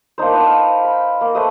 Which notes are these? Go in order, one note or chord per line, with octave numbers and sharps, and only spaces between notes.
A#3 D4 D#4 C5
B4 C5 D#5 F#5
D#5 F5
B5
A#3
A3 B4 C5 D#5